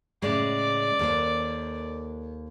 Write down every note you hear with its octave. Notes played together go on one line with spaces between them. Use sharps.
A2 C#3 G#3 D5
D#2 A4 C5